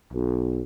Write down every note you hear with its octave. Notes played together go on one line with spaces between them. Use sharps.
B1